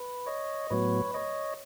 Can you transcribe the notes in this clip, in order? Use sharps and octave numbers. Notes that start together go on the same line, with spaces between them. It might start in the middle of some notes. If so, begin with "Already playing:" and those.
Already playing: B4
C#5 D#5
A2 F#3 B3 B4 C#5
C#5 D#5